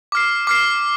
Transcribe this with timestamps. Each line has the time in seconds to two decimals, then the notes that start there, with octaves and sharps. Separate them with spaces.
0.12 D6 F6 C7
0.47 D6 F6 C7